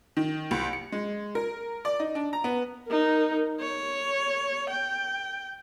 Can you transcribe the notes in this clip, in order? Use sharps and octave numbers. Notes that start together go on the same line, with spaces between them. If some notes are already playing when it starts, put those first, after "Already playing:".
D#3
C2
C#7
G#3
A#4
D5
D#4
D4
A#5
B3
D#4 A#4
C#5
G5